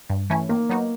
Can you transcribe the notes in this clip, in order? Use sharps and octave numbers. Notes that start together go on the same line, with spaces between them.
G2
E3 A3 C#4 E4
D#3 A#3
F#3 B3 D#4 F#4